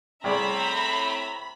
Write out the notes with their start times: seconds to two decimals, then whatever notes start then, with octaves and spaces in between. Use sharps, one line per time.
0.24 C2 A2 C4 G#4 D5 E5 A#5 B5